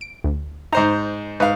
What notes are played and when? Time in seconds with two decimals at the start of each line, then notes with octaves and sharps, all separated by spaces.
0.01 D7
0.24 D2
0.73 G#2 D#4 C5 A#5
1.40 G#2 B4 F5